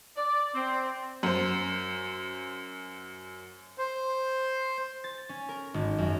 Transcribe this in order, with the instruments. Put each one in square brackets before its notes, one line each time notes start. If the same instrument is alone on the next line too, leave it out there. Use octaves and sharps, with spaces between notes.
[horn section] D5
C4
[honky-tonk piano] F#2 C5
[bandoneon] C5
[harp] A6
C#4
A#4
G#1
F#2